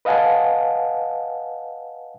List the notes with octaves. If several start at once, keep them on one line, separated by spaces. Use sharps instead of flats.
B4 D#5 F5 F#5 G#5 A5